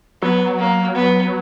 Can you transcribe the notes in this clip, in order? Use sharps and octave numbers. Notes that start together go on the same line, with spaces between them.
F#3 B3
A#3
B3